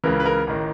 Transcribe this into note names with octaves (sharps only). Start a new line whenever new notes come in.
C#2 C#3 E3 A#4
B4
A#4
A1 D#3